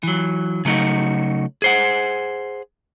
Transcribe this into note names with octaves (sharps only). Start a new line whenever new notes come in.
E3 F#3
C#3 F#3 A3 D#4 F#4
G#4 C5 F#5